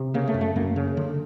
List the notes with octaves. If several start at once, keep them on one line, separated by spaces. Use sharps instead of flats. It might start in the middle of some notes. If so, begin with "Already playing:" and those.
Already playing: C3
C#3 A#3
A3
F#2
A3
F#2 A#3
C#3
D3